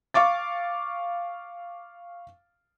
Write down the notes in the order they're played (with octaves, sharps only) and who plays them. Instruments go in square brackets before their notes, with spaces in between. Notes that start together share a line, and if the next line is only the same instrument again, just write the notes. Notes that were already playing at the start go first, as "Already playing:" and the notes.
[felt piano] F5 C#6 D6 A6